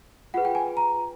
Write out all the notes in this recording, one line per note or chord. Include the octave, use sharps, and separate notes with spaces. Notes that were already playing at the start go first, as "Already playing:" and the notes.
F4 G#4 B4 F#5
G5
G#5
A#5